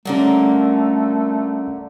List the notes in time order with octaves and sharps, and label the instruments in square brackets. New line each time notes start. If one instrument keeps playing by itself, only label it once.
[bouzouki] A#2 D3 A#3 [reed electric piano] G3 C#4 [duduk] A3